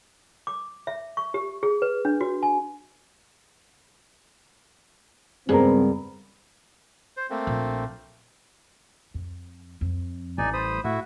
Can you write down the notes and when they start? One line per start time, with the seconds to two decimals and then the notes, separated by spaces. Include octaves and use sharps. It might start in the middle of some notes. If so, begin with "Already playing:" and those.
0.47 D6
0.87 E5
1.17 C#6
1.34 G4
1.63 G#4
1.82 B4
2.05 D4
2.21 F#4
2.43 G#5
5.49 C#2 G2 B3 C4 G#4 A#4
7.17 C5
7.30 A3 A#3 C4
7.47 A#1
9.14 F2
9.81 F2
10.38 A1 G3 D#4 D5 G#5
10.53 C5 B5 D#6
10.84 A2 A3 E4 F#4